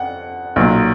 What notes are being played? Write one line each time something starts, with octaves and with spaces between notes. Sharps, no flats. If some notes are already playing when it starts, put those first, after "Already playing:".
Already playing: F2 F#5
B1 A#2 F#3